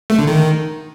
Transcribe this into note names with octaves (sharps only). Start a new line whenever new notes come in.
A3
D3
D#3